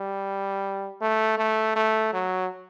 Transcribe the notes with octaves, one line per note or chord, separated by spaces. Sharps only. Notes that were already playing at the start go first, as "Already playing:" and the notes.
Already playing: G3
A3
A3
A3
F#3